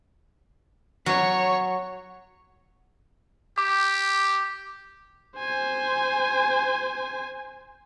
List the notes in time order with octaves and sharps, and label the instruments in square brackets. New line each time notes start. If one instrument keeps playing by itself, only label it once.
[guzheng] F#3 [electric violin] C#5 C#6
[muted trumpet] G4 [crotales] D6
[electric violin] C5 G#5